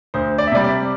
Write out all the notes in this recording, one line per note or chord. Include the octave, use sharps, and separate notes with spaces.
D2 C5
D5
E5
C3 G3 D5
D5